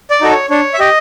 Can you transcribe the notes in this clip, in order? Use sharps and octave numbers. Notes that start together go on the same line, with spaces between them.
D5
D#4 F#4 A4
C#5
D4 C#5
E5
G4 D#5